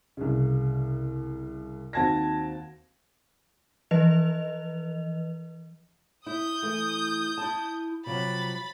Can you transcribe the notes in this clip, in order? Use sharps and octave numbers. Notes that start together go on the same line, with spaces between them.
C2 C#3
D#2 C4 F#4 A5 G#6 A#6
E3 F3 B4 D#5 F7
E4 D#6 G6
E3 A3
E4 A5
C3 F3 F#3 B5 A6